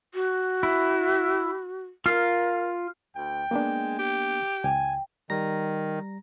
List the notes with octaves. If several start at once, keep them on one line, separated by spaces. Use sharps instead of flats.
F#4
E4
F4 A#4 F5
D2 G5
G#3 A#3 B3 D4
G4
C#2 G5 G#5
D#3 G3 A#5 A#6